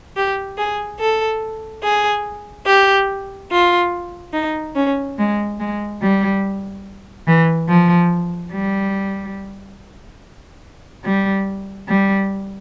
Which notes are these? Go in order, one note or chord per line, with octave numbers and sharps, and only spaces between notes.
G4
G#4
A4
G#4
G4
F4
D#4
C#4
G#3
G#3
G3
E3
F3
G3
G3
G3